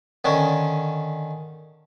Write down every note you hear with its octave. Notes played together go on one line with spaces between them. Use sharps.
D3 D#3 C#4